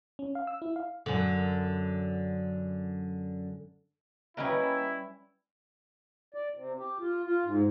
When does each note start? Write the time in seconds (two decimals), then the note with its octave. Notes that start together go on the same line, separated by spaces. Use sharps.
0.19 C#4
0.35 F5
0.47 E6
0.62 E4
0.76 F5
1.06 F#2 D3
4.37 G3 A#3 C#4 E4 B4 D#5 G5
6.34 D5
6.54 C3
6.79 G4
6.99 F4
7.24 F4
7.45 G#2